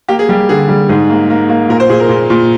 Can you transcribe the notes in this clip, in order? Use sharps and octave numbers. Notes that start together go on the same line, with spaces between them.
A#3 G4
G#4
G3 G4
D3 G#4
G3
G#2 G#4
A#3
A#3
A#3
A#2 A#4
C5
A#2 G#4
A#4
A#2
A#2